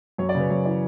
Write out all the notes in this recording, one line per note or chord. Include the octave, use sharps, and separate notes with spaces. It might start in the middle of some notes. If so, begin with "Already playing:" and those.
F#2 C#5
D5
C#3
B4
F#2 C#5
E3 D5